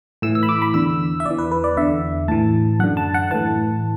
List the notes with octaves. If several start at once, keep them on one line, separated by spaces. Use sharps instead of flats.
A2 E3 E6
E6
B5
D6
B5
E2 D3 E6
E5
E2 E3 D5
B4
B4
D5
E2 D3 E5
A2 E3 A5
F#2 D3 F#5
A5
F#5
A2 E3 A5